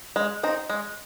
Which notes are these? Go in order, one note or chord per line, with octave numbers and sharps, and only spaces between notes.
G#3
C4 D#4
G#3